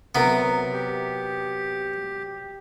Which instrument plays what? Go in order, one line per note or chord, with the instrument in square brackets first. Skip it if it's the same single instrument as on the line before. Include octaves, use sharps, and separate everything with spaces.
[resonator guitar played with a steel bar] C3 F#3 A#4 [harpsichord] B3
[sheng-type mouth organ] G4